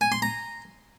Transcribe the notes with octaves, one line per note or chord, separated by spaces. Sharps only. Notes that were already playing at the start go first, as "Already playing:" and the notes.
G#5
C6
A#5